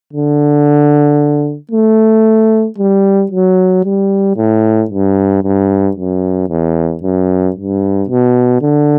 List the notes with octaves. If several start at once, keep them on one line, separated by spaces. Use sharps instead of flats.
D3
A3
G3
F#3
G3
A2
G2
G2
F#2
E2
F#2
G2
B2
D3